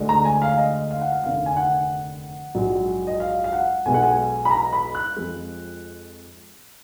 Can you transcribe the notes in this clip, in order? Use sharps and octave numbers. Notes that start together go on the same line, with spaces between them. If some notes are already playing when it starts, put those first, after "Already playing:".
Already playing: D2 D3 G#3
A#5
G#5
F5
D#5
F5
F#5
F5
F1 D#2 D3 F5
G#5
F#5
A#1 G#2 F#3
D#5
F5
F5
F#5
B1 B2 G#3 G#5
F#5
G#5
B5
A#5
B5
F#6
F2 F3 G#3